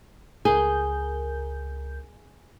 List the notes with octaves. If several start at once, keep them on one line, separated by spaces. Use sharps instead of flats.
C#2 G#4 A#4 G6